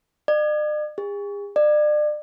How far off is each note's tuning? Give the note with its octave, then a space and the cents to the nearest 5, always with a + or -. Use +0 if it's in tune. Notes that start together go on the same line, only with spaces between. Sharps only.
D5 +45
G#4 -40
D5 +35